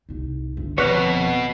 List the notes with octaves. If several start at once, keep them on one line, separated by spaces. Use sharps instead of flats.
C2 D#4
G1 D#3
F2 B2 B4 C#5 F#6 F7